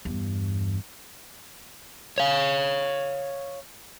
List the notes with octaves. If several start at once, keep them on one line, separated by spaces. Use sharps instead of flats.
E2 G2
C#5 F5